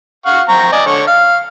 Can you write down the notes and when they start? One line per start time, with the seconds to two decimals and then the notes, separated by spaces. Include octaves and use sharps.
0.26 F5 F#5 C#6
0.49 C4 A#5 C#6
0.72 D5 D#5 G#5
0.86 D3 C#5
1.07 F5